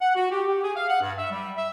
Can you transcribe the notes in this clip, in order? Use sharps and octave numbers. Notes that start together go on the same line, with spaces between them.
F#5
F#4
G4
G4
G#4
F5
F#5
G2
E5
G3
E5